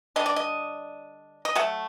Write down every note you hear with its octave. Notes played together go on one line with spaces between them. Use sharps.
D3 G3 D4 D#5
D5
D#5
D#5
F#3 A3 F#5